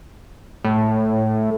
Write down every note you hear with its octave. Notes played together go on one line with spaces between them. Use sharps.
A2